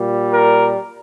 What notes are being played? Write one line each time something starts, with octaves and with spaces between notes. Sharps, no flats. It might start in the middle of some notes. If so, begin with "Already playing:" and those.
Already playing: A#2 G3
A#4